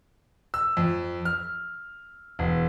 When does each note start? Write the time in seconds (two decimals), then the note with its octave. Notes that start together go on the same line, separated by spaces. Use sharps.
0.54 E6
0.77 F2
1.25 F6
2.39 E1